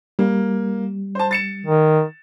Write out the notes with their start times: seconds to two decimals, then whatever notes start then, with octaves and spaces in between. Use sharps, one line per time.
0.19 G3 A#3
1.15 C5 A5
1.31 A6 C#7 E7
1.66 D#3